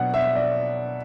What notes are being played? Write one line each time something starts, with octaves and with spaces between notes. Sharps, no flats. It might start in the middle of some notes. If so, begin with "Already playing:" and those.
Already playing: B2 F#3 B3 D4 F#5
E5
D5